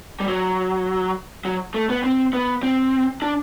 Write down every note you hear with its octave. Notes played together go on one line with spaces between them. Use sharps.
G3
F#3
F#3
A3
B3
C4
B3
C4
D4